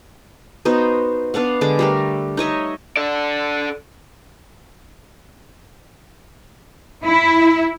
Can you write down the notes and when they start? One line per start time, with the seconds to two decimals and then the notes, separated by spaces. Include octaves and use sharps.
0.65 B3 D#4 F#4 C5
1.34 B3 D4 F5 F#5
1.61 D3 G#3 D4 D6
1.79 G3 A3 A#4
2.37 D#4 C#5 D#5 E5
2.97 A4 D5
7.04 E4